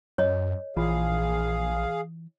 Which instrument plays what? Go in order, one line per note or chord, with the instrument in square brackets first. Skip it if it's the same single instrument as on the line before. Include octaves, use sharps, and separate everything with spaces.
[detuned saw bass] F#2 [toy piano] C#5 D#5
[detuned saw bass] A#1 [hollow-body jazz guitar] E3 F4 B5 [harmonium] G#4 F5